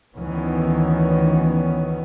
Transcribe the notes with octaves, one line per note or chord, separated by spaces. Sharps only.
D2 D#3 E3 B3 C#4